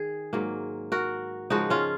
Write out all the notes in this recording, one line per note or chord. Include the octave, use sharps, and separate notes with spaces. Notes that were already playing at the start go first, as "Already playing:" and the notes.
Already playing: D#3 G#4
G#2 F#3 A#3
F#4 A#4
C#3 F3 G#3 D#4 F#4
C#4 F4